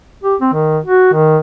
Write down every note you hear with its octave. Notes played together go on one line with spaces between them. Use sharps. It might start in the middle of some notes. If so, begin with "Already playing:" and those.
G4
C4
D#3
F#4
D#3